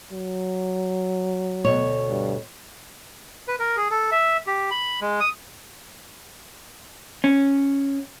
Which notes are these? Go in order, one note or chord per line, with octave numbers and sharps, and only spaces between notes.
F#3
D2 B2 C#5
G2
B4
A#4
G#4
A4
E5
G4
B5
G#3
D#6
C#4